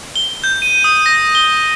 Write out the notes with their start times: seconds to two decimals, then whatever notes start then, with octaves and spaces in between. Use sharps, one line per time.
0.16 G7
0.44 G6
0.62 D#7
0.84 D#6
1.06 A#6
1.35 G7